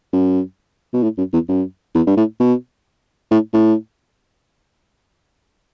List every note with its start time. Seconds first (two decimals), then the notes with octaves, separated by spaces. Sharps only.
0.13 F#2
0.93 B2
1.03 A2
1.18 F#2
1.33 E2
1.49 F#2
1.95 E2
2.07 G2
2.17 A2
2.40 B2
3.31 A2
3.53 A2